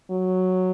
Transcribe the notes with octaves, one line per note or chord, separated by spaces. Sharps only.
F#3